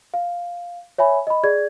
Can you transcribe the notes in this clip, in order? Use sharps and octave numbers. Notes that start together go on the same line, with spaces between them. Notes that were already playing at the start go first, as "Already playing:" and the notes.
F5
C#5 E5 G#5 B5
D#5 B5
G#4 D5 G#6